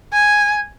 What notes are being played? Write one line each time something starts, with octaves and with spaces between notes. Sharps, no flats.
G#5